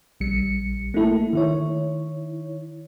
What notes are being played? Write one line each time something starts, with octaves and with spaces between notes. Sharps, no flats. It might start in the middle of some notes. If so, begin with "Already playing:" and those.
A#1 G3 C#7
A3 A#3 E4 A4
D#3 E4 C#5